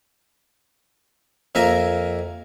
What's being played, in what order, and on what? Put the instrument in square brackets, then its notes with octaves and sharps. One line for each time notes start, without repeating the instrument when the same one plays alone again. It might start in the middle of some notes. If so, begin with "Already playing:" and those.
[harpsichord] F2 A#3 E5 G#5 A#5